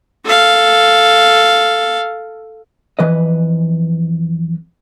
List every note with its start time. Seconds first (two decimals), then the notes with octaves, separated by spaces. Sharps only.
0.25 A4 F5
2.99 F2 E3 B4 D#5